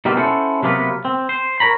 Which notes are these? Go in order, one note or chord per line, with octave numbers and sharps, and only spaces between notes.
B2 G3 A#3 C4 F4 G4
C#4 E4 A4 C5 F#5
C3 F#3 A#3 B3 F4 B4
C4
C5
A#4 C#5 A#5 B5